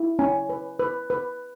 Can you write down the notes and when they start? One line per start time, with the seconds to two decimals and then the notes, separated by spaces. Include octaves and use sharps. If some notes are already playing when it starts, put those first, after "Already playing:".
Already playing: E4
0.19 C#4 G#5
0.49 B4
0.79 B4
1.10 B4